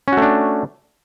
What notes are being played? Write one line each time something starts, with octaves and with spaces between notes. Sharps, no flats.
A3 C#4 D4 F#4